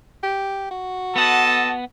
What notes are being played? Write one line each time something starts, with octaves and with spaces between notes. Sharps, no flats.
G4
F#4
B3 A4 D#5 F#5 A5